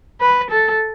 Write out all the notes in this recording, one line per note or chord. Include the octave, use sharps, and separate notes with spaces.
B4
A4